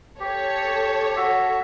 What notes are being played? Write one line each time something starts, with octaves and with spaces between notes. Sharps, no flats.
G4 A4 C#5
F#4 E5